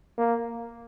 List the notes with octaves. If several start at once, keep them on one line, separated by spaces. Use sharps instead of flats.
A#3